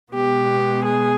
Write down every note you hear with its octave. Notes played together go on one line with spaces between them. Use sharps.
B2 G#3 B3 G4
G#4